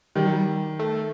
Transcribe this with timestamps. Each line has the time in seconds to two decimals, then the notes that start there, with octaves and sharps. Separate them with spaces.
0.16 D#3 G3
0.26 F#3
0.32 G3
0.79 A3